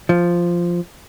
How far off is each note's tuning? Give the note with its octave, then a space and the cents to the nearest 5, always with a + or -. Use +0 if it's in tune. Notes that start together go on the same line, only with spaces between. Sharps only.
F3 -5